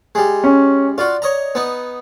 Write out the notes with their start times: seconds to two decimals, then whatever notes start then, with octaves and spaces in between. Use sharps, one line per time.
0.15 G3 G#3
0.44 C#4
0.98 F4 F#4 D5
1.22 C#5 D#5 A#5
1.55 B3 D#4